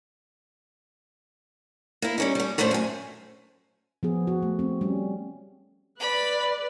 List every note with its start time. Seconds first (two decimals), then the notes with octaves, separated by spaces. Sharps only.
2.02 A#3 E4
2.18 G3 C#4 D#4
2.35 G3 C#4
2.58 A2 A3 C#4 D4 G4 C5
2.71 F#2 G#5
4.03 F3 B3 G#4
4.27 F#4
4.43 A3
4.59 C4
4.81 G3 C#4
6.00 B4 D5 B5